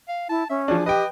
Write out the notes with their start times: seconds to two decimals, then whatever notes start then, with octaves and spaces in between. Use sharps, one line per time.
0.08 F5
0.29 E4 A5
0.50 C#4 E5
0.68 F3 D4 G#4
0.86 G4 B4 D#5 G5